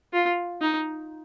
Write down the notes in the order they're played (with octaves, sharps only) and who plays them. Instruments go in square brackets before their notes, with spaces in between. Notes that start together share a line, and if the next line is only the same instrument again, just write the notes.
[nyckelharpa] F4
D#4